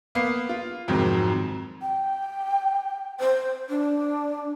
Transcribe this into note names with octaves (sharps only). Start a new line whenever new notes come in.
A#3 B3 C7
F4
F2 G#2 C3 D#3 F#3
G5
C5
D4